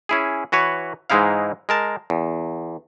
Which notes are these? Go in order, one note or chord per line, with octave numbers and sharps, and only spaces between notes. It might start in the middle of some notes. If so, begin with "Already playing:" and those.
C#4 E4 G#4
E3 F#4 B4 C#5
G#2 E3 G#3 D#4 E4 F5
G#3 A#4 A5
E2